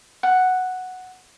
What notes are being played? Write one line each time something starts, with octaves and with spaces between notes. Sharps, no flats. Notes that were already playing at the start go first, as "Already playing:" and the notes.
F#5